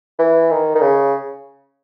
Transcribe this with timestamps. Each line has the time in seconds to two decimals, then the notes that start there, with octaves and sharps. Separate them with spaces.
0.19 E3
0.51 D#3
0.75 D#3
0.82 C#3